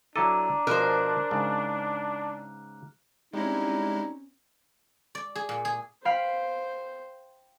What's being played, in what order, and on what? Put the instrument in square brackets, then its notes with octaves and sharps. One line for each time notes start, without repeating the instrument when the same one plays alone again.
[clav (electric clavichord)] F#3 E4 A4 [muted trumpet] D4 [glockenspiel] A#5 D6 D#7
[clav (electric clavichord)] B2 F3 [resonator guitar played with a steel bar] A#4 C5 [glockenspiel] F6 F#6
[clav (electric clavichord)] G#2 C#3
[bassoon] G3 [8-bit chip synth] G#3 E4 [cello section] C4 C#4 [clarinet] D#4
[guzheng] D5
G#4
A#2
G#4
[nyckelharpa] C5 [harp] F5 G5 B5